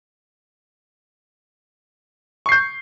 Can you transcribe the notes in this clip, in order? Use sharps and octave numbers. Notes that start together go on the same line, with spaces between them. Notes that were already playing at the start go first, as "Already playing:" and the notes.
C#6 G6 C7